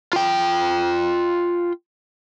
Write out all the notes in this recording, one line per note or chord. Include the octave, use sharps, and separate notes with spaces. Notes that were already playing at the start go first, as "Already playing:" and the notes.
F4 G5